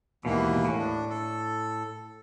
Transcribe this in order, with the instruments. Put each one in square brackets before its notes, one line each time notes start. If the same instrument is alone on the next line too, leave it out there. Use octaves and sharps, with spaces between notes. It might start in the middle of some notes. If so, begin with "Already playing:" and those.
[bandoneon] D#2 E3 A#3 [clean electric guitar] G#2 B2
[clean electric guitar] A2
[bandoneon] D4
A4